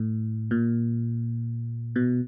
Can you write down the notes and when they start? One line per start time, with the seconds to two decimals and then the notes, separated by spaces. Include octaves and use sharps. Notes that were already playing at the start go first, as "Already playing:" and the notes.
Already playing: A2
0.51 A#2
1.96 B2